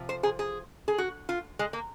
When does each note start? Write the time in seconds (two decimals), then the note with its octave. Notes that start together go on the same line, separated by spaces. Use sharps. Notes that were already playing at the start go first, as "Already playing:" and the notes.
Already playing: C3 F3
0.09 C5
0.23 G#4
0.39 G#4
0.88 G#4
0.98 F#4
1.29 F4
1.59 G#3
1.73 A#3